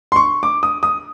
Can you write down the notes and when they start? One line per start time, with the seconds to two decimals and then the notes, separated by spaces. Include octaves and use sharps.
0.12 C6
0.16 C#6
0.43 D6
0.63 D#6
0.83 D#6